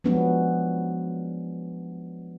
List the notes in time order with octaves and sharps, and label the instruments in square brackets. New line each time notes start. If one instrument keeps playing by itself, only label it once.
[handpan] F3 F#3 G#3 B3 C#4 D4